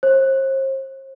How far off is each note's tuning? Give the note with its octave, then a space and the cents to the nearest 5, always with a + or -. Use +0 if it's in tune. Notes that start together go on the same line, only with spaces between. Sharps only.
C5 +40